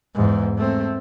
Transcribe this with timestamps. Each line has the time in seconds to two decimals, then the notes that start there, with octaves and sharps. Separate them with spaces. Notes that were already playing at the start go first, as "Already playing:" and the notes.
0.15 E2 G#2
0.58 A3 C4